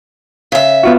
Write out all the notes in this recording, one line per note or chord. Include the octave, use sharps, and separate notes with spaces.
C#3 E5
B3 F4 F#4